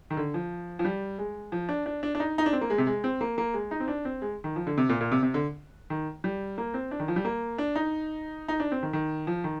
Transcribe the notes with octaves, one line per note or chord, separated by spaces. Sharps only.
D#3
D3
F3
F3
G3
G#3
F3
D4
D4
D4
D4
D#4
D#4
D4
C4
A#3
G#3
C3
G#3
C4
A#3
A#3
G#3
D#4
C4
D4
C4
G#3
D#3
F3
D3
C3
A#2
A#2
C3
C3
D3
D#3
G3
A#3
C4
D4
D#3
F3
G3
A#3
D4
D#4
D#4
D4
C4
D#3
D#3
F3
D#3